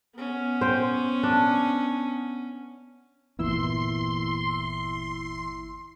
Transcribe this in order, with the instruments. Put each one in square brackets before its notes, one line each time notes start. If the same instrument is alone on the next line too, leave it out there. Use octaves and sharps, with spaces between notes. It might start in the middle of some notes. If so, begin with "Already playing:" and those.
[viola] B3 C#4
[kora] C5 G5
D4
[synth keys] G1 E4 E6 [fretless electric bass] E2 A#2 E3 [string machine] C6